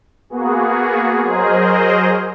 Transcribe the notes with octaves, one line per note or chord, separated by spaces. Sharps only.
A#3 B3 F#4 G#4
F#3 G#4 A#4 C5 D#5